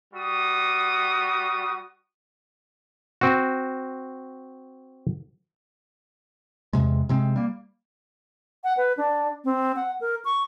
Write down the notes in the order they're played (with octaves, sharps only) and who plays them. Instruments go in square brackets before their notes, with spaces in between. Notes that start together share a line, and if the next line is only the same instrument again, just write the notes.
[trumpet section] G3 F#4 D#6
[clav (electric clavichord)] C4 F#4
[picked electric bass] E2 C3 G#3
C3 G#3 C4
G3 A#3
[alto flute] F#5
B4
D4
C4
F#5
A#4
C#6